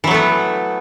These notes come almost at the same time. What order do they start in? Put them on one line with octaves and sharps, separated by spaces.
E3 F#3 A3 B3